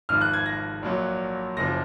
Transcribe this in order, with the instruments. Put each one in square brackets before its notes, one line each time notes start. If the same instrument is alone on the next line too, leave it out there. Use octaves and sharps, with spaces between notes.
[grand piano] G#1 G#2 F3 F6
F#6
G#6
A#6
A#1 A#2 F#3
F#1 F#2 F3 A#6